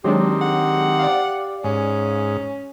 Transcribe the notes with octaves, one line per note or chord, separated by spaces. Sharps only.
D#3 F#3 G#3 C4 D4 G4
F#5
D5 F5
G#2 C#4